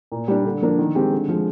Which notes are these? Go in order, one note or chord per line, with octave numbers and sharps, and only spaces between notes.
A#2
G3 D4
D3
F3 A#3 D4
D#3
G#3 C4 G4
D3
F3 G#3